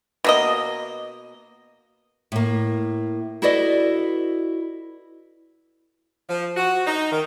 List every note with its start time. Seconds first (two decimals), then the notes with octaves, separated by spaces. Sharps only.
0.24 B2 A#3 D#5
2.32 A2 A#3
3.42 E4 F#4 A4 B4 D5 D#5
6.29 F3
6.57 F#4
6.87 D#4
7.12 D#3